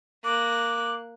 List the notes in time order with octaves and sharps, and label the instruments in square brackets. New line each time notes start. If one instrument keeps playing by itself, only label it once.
[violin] A#3 F#6 [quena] D6